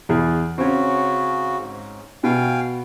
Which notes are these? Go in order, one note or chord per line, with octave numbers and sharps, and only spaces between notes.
E2 G#4
C#3 C4 C#4 F#4
G#2
B2 F5 G5 G#5